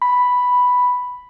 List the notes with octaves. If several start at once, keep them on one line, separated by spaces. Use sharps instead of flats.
B5